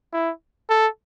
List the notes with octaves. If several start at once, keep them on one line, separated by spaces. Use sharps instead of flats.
E4
A4